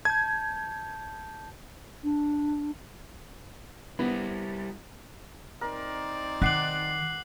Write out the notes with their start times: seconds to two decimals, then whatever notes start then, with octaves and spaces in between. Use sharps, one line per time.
0.05 A5 G6 G#6
2.03 D4
3.99 G3 B3 E4
5.61 C4 D#4 A#4 D5
6.42 D#3 F#5 D6 F#6 C7 F#7